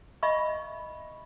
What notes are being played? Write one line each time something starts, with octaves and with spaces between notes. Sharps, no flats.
D#5 E5 B5 C#6